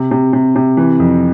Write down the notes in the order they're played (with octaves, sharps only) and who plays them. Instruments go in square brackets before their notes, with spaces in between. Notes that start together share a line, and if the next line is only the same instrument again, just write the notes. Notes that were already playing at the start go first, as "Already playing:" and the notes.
Already playing: [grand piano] C3
C3
C3
C3
E3
F2